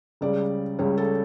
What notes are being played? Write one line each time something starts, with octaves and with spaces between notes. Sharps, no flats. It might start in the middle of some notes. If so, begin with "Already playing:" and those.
C#2 C#3 G3 D5
C#2 C#3 G3 C#5
A4